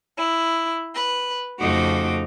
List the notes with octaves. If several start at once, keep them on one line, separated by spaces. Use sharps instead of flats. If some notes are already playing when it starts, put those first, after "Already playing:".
E4
B4
F2 C#3 A3 D#4 F#4 D6